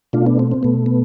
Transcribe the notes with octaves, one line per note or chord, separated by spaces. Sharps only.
B2 A3 D4 F4
B3 D4
C4
C4
B2 A3 B3
B3